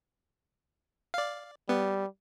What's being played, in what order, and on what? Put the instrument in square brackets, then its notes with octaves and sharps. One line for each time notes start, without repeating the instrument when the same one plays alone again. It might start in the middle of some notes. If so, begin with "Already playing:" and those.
[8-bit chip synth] D5 F5
[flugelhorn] G3 [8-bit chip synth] B3